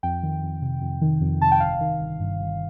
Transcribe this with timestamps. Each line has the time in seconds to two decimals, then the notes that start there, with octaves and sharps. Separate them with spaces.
0.03 F2 G5
0.23 D#3
0.43 F2
0.62 C3
0.82 F2
1.02 D#3
1.21 F2
1.41 C3 A5
1.52 G5
1.60 G1 F5
1.81 D#3
2.00 G1
2.20 G2
2.39 G1